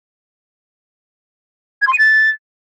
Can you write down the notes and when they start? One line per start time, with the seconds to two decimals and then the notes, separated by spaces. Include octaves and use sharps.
1.82 G#6
1.87 C6
1.93 D#7
1.98 A6